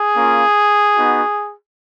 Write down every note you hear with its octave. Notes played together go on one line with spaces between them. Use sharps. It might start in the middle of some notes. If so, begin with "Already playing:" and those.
Already playing: G#4
A#3 C#4 F4
B3 D#4 F#4